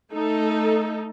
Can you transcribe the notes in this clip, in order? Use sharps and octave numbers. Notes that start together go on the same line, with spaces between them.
A3 D#4 A4